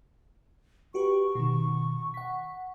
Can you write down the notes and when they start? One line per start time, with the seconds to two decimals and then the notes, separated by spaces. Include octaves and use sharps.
0.94 F#4 G4 B4 C#6
1.35 B2 D#3
2.14 F#5 B6